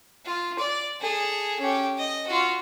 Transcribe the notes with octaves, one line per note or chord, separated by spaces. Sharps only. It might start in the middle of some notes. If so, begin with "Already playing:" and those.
F4
D5
G#4 A4
C#4 G4
D#5
F4 F#4